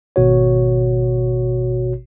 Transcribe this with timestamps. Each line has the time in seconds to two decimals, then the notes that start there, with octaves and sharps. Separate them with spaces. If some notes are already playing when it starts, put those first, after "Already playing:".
0.16 G#1 B2 F#4 C#5